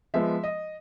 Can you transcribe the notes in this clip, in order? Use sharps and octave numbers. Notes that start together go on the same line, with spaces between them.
F3 G#3 B3 E5
D#5